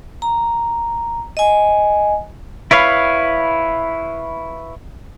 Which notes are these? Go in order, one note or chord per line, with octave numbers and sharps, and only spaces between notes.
A#5
D#5 G#5
E4 B4 C#5 F5